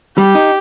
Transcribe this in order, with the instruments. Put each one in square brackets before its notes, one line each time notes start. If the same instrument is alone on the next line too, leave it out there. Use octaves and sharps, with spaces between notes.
[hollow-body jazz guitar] G3 [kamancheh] G4
[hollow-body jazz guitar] D#4